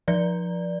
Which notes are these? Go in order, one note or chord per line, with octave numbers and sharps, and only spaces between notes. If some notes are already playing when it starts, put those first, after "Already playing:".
F3 D5